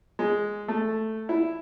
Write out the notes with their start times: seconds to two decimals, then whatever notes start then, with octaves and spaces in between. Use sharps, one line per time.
0.19 G#3
0.68 A3
1.29 E4